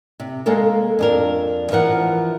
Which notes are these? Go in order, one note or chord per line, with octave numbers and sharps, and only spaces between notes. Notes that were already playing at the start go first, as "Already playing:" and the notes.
C3
G#3 A#3 A4 A#4
F2 D4 A#4
E3 F3 A#4 F#5